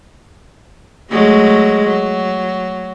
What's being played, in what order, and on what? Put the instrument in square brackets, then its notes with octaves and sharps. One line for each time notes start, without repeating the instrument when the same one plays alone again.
[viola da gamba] F#3 G#3 A3
F#3